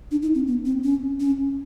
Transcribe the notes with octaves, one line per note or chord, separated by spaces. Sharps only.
D4
D#4
C4
B3
C4
C#4
C#4